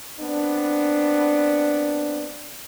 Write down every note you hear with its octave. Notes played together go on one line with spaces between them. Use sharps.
B3 C4 D4